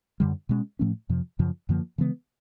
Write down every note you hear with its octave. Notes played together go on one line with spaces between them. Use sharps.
F#2 D3 G3
B2 G#3 C#4
A2 F3 A3 C#4
F2 C3 F3
F#2 C#3 F3
F#2 D3 F3 A#3
C#3 E3 G#3 B3